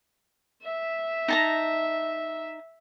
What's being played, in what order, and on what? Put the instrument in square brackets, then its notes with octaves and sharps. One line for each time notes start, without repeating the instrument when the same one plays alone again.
[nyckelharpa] E5
[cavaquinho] D#4 A5 A#5